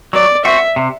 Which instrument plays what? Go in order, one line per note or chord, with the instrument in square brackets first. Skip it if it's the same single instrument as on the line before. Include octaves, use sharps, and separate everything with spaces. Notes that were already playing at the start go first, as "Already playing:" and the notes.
[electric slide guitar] F#3 [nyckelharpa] D5
[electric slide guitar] C4 F#4 [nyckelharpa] E5
[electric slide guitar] C3